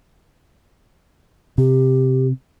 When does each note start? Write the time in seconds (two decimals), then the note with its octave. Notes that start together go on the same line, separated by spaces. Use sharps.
1.58 C3 G4